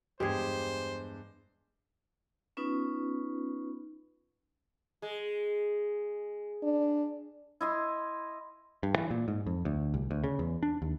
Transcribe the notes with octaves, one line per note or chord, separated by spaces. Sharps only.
E2 G2 G#3 G4 G#4 C5
B3 C#4 D#4 F4 B4
G#3
D4
E4 D#5 C6
G2
E3
A#2
G#2
F2
D2
C2
D2
C#3
E2
D4
D#2